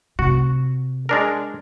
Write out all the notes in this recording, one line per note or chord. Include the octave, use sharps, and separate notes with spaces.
C3 F#4
G#3 D4 A#4